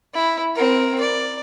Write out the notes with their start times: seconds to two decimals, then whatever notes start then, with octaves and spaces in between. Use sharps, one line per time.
0.15 E4
0.56 C4 A#4
1.01 D5